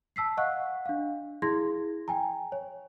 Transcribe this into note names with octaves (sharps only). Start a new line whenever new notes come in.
A5 E6 B6 C7
D#5 F5 F#5 C#6 F#6
D4 F5
E4 G#4 C6 G#6 A#6
G5 G#5 A#5
C#5